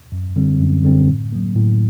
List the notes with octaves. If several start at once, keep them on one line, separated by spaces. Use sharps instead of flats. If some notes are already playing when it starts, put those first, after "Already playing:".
F#2
D3 G3 C4
F#2
D3 G3 C4
A2
F#3 A#3
A2